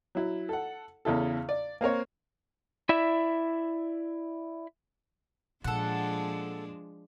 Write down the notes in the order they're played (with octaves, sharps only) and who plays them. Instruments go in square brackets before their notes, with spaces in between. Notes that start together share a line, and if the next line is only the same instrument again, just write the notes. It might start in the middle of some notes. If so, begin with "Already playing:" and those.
[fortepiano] F#3 E4
A4 F#5
E2 C#3 E4 A4
D5
A#3 C4 A#4 C#5
[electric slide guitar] E4 D5 E5
[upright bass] A#2 [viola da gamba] F3 G#3 D4 [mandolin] A4 F#5